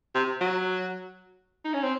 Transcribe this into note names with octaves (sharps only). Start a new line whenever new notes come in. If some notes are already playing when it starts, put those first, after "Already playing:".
C3
F#3
D#4
C#4
C4